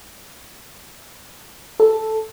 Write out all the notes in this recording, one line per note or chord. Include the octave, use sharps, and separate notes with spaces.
A4